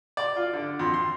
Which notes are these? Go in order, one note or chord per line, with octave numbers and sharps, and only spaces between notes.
D5
F4
D3
F2
C6